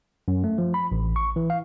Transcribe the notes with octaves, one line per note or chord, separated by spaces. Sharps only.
F#2
A3
F3
B5
A1
C#6
E3
F5